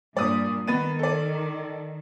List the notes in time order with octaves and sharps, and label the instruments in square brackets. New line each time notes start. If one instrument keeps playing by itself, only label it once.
[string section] G2 A#2 [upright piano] D5 D#6
[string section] D#3 [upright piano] B3 A6 D#7
[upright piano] A4 D5